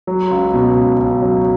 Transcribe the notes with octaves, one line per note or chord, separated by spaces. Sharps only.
F#3
C#2
B2
C#2
C#2
F#3